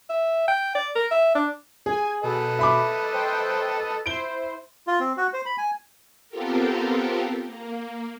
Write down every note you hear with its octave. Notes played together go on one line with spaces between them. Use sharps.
E5
G5
D5
A#4
E5
D4
G#4 G#5
B2 A4 B4 D#5
E5 B5 D6
C5 G5
E4 C5 D7 G7
F4
C4
F#4
C5
B5
G#5
B3 C4 F4 G4 A4 A#4
A#3